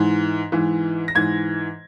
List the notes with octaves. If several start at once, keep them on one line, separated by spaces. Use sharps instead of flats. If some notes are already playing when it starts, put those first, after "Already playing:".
Already playing: G#2 E3
G#2 E3
A#6
G#2 E3 G#6